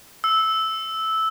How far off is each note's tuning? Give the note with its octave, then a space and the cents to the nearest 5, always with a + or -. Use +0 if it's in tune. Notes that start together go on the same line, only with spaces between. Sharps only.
E6 -10